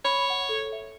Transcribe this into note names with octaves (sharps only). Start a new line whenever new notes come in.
C#5 B5
F#5
A4
E5